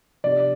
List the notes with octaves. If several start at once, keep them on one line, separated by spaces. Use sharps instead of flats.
C3 F3 B3 D4 G4 D5